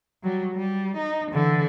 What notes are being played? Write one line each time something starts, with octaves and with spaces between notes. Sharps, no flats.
F#3 G3
G3
D#4
D3 E3